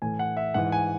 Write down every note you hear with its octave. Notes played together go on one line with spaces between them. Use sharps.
A2 E3 G#5
F#5
E5
G#2 E3 F#5
G#5